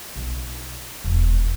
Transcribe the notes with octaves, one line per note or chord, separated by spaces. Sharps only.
B1
E1